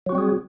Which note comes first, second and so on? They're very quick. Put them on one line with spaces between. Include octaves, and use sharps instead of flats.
F#3 F#4 C4 G3 G#4